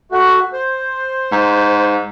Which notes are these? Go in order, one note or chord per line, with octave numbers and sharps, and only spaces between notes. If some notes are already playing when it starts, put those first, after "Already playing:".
A3 F#4
C5
G#2